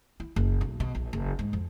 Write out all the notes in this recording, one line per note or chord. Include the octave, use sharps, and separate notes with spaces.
E4
F#1
B1
B2
A#1
F#1
G#2
F2